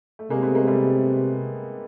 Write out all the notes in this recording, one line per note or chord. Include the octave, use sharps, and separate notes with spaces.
A3
C3 G#3 A#3
A3 B3
G#3 A#3
G3 A3